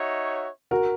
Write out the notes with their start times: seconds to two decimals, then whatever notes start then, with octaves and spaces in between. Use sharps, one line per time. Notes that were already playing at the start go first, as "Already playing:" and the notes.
Already playing: D#4 F#4 C#5 E5
0.71 F#4 A#4